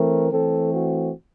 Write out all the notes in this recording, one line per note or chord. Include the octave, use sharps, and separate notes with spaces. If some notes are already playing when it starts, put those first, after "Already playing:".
Already playing: E3 A3 C4 A#4
E3 A3 C4 A4
F#4